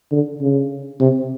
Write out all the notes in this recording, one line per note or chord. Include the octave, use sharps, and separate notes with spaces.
D3
C#3
C3